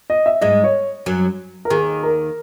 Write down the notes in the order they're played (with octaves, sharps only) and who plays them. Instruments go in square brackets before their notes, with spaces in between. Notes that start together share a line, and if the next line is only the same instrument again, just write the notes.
[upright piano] D#5
E5
[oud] G#2 G#3 [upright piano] D#5
[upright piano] C#5
[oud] F#2 F#3
[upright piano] A#4
[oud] D#2 D#3 [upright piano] G#4
[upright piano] A#4